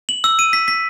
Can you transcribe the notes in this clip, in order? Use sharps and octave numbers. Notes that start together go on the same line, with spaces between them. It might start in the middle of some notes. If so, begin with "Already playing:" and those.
F#7
E6
D#7
B6
B6